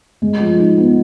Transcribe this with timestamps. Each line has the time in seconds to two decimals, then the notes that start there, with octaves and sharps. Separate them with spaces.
0.22 G#3
0.40 F3
0.59 D#4
0.78 B3